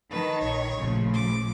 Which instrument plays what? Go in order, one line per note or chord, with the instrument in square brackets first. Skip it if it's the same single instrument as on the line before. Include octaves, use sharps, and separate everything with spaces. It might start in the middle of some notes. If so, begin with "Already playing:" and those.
[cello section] D#3 [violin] B4 A5
[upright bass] A#1 [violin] C#5
[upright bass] A1 A#2 [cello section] C#3 F3 A3
[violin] D6